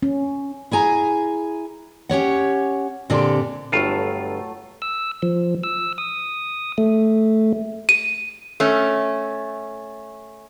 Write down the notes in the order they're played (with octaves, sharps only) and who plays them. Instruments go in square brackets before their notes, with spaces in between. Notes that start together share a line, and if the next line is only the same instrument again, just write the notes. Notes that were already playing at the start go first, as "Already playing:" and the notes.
[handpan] C#4
[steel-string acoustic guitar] E4 G#4 G#5 A#5
C#4 G4 C#5 F#5
A#2 D3 C4 G4 A4 D5
[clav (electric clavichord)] G1 G2 F4 [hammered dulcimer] F#3 A3 A4
[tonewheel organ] E6
F3
E6
D#6
A3
[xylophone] D#7
[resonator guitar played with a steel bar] A3 C#4